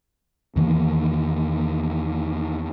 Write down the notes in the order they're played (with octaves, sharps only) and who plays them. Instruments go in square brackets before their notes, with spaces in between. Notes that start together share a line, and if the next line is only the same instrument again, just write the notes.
[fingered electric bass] E2 D#3 E3 A#3